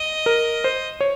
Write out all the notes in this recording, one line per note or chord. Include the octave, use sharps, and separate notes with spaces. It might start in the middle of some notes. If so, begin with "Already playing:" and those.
Already playing: D#5
A#4
C5
C#5